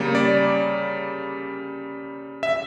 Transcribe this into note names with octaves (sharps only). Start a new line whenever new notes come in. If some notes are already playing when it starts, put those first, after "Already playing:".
Already playing: C#3 G3 A#3 C#5
D5
E5